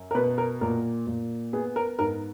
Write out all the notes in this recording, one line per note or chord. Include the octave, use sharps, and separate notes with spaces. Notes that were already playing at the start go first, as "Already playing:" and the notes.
Already playing: F#2
A#4
B2 B4
A#4
A#2 A#4
A#2
B3 G#4
A#4
G#2 A#4